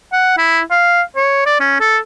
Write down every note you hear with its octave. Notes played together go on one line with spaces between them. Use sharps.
F#5
E4
F5
C#5
D5
C#4
A4